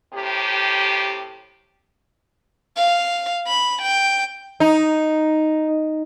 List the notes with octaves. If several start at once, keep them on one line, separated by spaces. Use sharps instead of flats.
A2 C3 G4
F5
B5
G5
D#4